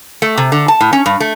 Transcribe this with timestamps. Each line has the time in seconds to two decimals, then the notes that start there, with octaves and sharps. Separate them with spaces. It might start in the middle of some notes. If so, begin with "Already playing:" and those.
0.22 A3
0.37 C3
0.52 D3
0.68 A5
0.81 A2
0.93 C#4
1.06 G2
1.20 A3